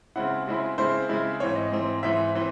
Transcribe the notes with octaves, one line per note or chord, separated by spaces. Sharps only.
C#3 G#3 C4 E4 F#5
C#3 G#3 C4 E4
C#3 G#3 C4 E4 C5
C#3 G#3 C4 E4
G#2 E3 C4 C#5
D#5
G#2 E3 C4
G#2 E3 C4 E5
E3 C4